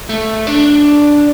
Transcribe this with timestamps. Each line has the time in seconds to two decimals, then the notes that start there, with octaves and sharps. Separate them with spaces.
0.09 A3
0.47 D4